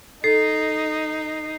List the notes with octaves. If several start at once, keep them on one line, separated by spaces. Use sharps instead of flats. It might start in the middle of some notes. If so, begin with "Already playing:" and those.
D#4 A4 D#5 C7